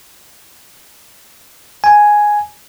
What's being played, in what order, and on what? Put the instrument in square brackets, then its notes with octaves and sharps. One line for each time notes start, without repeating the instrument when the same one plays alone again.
[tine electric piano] G#5